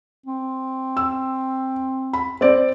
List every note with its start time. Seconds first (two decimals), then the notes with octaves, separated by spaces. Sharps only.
0.26 C4
0.97 E6
2.13 B5
2.41 C4 D5